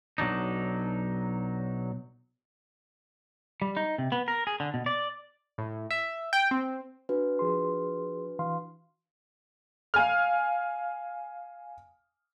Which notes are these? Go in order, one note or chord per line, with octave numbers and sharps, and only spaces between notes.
B1 F#3 D4 D#4
G3
D#4
C3
B3
A#4
G#4
D3
B2
D5
A2
E5
G5
C4
D4 F#4 B4
F3 G#4 C6
E3 F5 C6
F5 G#5 F6